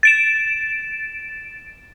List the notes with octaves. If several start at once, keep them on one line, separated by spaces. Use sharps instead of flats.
A6 D7 E7